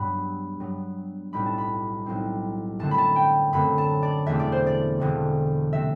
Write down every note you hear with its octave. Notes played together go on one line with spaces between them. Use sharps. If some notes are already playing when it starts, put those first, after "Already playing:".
Already playing: G2 F#3 B3 B5
G2 F#3 B3
B1 A2 G3 C4 B5
A5
B5
B1 A2 G3 C4
F#2 D3 A3 C4 A5
B5
A5
G5
F#2 D3 A3 C4 B5
A5
D5
E1 E2 D3 A3 C4 E5
D5
C5
D5
E1 E2 D3 A3 C4
C3 F#3 A3 C4 E5